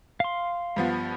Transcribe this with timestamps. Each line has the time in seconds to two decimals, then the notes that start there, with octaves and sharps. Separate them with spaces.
0.20 F5 C6
0.76 G2 F3 B3